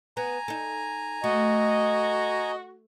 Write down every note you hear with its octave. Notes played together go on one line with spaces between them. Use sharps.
B3 G#5 A#5
D#4 A4
A3 F#4 D#5